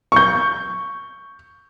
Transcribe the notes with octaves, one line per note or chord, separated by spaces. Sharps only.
C#6 G6